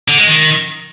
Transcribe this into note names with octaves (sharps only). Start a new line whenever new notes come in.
D3
G#3
D#3